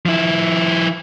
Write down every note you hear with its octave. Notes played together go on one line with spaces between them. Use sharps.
F3 E4